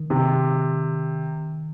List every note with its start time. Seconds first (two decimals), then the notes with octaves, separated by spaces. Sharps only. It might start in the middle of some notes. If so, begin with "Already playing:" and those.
Already playing: D#3
0.10 C3